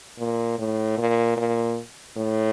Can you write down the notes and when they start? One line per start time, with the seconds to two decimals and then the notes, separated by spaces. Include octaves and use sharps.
0.19 A#2
0.59 A2
0.98 A#2
1.37 A#2
2.17 A2